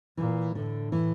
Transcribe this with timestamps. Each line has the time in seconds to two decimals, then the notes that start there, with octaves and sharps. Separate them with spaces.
0.17 A#2 E3
0.55 A2 D3
0.92 E3